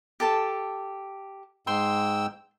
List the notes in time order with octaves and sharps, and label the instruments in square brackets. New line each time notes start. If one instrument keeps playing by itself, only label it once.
[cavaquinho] G4 A4 A5
[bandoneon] G#2 G5 E6 [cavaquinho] C6